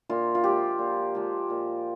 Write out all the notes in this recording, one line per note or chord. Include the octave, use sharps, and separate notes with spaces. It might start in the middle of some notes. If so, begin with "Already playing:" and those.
A#2 F4
F4
F3 G#3 G4
A#2
F3 G#3
A#2